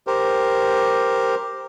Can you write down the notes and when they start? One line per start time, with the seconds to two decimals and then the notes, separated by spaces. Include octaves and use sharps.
0.07 G4 A#4 C5